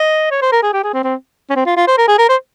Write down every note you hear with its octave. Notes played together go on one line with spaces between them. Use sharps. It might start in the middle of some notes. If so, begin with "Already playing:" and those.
Already playing: D#5
C#5
C5
A#4
G#4
G4
G#4
C4
C4
C#4
C4
F4
F4
C5
A#4
G#4
A#4
C5